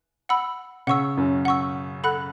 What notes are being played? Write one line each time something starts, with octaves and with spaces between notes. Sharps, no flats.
F#5 B5 E6
C#3 F#5 C#6 E6
F#2
F#5 C#6 E6
A4 F#5 B5 F#6